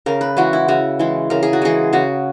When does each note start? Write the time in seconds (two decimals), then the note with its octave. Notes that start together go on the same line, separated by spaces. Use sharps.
0.06 C#3 A#4
0.21 B4
0.37 E3 G#3 F#4
0.53 E4
0.68 C#3 F#4
0.99 E3 G#3
1.30 C#3 A#4
1.43 G#4
1.53 F#4
1.62 E3 G#3 G#4
1.93 C#3 F#4